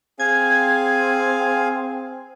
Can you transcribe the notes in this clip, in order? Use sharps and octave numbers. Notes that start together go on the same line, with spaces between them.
C4 G#4 F5 G#5 G#6